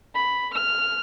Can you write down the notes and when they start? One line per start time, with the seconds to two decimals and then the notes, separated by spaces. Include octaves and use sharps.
0.15 B5
0.54 F6